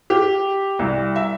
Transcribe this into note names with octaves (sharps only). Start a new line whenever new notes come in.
G4
C2
E5